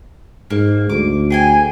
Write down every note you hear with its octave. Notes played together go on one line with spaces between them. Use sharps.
G#2 A#3
D2 D6
G#4 G5 G#5